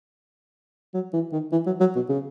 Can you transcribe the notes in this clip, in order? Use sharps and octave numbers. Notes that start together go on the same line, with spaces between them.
F#3
E3
D#3
E3
F#3
F#3
B2
C#3